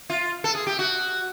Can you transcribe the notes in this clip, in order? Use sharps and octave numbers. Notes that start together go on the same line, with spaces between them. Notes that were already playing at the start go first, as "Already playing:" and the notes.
F4
A4
G#4
G4
F#4